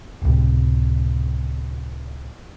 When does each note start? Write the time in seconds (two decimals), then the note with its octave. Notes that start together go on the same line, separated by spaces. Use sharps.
0.22 C#2 A2 C3